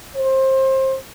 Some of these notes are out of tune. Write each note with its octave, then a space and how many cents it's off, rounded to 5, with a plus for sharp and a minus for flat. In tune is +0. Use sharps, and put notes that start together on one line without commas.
C5 +25